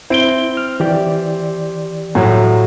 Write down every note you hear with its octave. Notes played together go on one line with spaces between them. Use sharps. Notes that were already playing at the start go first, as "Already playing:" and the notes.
C4 E4 D7 G7
F6
E3 G4 D5
A2 F#3